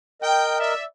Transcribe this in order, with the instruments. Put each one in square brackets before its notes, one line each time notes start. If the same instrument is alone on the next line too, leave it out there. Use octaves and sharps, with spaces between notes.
[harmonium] A#4 D#5 [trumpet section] G5
[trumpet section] D5 E5